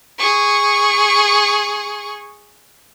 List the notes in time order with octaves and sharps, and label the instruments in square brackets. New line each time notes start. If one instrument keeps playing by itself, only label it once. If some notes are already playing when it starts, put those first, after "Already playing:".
[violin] G#4 C#6